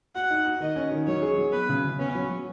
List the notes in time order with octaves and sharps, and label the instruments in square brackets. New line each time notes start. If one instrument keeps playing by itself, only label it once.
[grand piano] F#4 [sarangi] F#5
[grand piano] D#4
F#4
[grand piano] D#3 [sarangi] D#5
[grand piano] C#4
D#3
[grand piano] F#3 [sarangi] C#5
[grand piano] G#4
F#3
[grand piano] B3 [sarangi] B4
[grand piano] C#3
C#3
[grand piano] B3 [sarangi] C#4
[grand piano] F#3
F#3